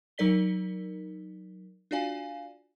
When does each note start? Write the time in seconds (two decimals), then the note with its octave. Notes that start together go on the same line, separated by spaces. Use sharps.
0.18 F#3 D#4 A#4 D5 B6 G7
1.91 D4 F4 F#4 D5 F5 G#5